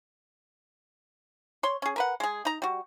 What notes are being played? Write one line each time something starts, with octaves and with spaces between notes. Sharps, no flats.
C#5 C6
C#4 G#4
A#4 B4 F#5
G#3 G#4
D#4 A#5
G3 F#4